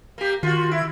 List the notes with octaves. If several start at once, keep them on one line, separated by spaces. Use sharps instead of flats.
A#3 G4
D#3 F4 F#4
E4